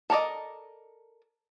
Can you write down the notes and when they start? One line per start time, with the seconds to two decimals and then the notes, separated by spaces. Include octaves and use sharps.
0.10 A4 A#4 D5 D#5